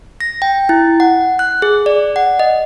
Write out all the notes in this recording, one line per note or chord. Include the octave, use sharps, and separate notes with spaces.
A#6
G5
E4
F#5
F#6
G#4
D5
F#5
D#5